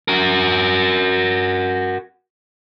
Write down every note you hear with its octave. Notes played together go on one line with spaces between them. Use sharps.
F#4 A#4